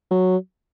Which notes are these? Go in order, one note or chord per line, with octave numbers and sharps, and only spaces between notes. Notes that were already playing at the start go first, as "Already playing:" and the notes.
F#3